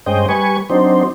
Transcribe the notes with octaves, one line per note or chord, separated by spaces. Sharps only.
G2 G#3 C#4 C5 D#5 G5
G3 B4 G#5 C#6
F#3 C4 D4 D#4 C5